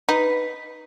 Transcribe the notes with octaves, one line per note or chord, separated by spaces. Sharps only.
D#4 B4